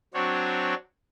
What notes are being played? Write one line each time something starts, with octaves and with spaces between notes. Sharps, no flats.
F#3 C4 D4 F#4 C#5